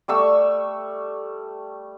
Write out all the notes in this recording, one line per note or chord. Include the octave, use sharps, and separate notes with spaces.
G3 A3 C#6 E6